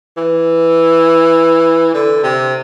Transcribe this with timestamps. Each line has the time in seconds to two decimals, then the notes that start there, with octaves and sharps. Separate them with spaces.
0.17 E3
1.94 D3
2.23 C3